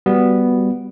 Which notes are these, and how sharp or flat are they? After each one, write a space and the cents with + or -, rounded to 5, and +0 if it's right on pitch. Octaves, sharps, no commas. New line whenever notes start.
G3 +0 B3 +0 F#4 +0